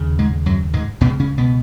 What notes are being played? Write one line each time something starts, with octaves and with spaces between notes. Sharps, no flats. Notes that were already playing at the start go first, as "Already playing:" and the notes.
Already playing: D#2 C#3
G#2 G#3
F#2 F#3
G#2 G#3
C#2 B2 B3
C#3
C#3 C#4
B2 B3